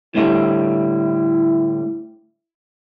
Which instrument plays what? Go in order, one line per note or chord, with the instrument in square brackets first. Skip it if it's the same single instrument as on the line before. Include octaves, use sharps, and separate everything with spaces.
[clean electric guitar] A2 D3 G3 [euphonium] E4